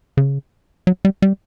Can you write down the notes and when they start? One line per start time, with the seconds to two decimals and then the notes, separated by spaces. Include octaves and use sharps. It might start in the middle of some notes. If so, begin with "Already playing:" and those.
0.17 C#3
0.87 F#3
1.05 G3
1.22 G3